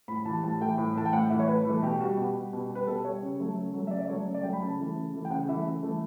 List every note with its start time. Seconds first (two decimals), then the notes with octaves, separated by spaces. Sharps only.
0.08 A2 B5
0.25 E3 G3 A5
0.43 A2 A5
0.61 E3 A3 G5
0.78 A2
0.96 E3 A3 A5
1.05 G5
1.13 A2 F#5
1.30 E3 A3 E5
1.40 C#5
1.47 A2 B4
1.65 E3 A3
1.82 B2 G4
2.00 G3 F#4
2.17 B2 G4
2.35 G3
2.53 B2
2.69 G3
2.75 B4
2.87 B2 A4
3.04 G3 C#5
3.22 C#3
3.40 F#3 A3
3.57 C#3
3.74 F#3 A3
3.87 E5
3.91 C#3 D5
4.01 D5
4.09 F#3 A3 C#5
4.27 C#3
4.34 D5
4.43 F#3 A3 G5
4.53 B5
4.62 C#3 A5
4.79 E3 A3
4.95 C#3
5.14 E3 A3
5.25 G5
5.30 C#3 F#5
5.48 E3 A3 E5
5.66 C#3
5.83 E3 A3